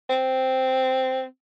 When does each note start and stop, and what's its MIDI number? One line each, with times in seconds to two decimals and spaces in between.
0.09 1.23 60